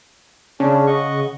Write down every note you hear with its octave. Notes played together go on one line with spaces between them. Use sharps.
C#3 C#4 D4
D#5 F#5 C#6